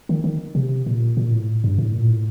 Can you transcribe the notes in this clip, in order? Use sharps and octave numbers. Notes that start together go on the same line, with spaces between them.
D#3
D#3
C3
A#2
A#2
A2
G2
A2
A#2
A2